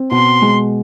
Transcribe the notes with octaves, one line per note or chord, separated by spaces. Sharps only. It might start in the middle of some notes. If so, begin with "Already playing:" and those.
Already playing: C4
B2 C6
G#3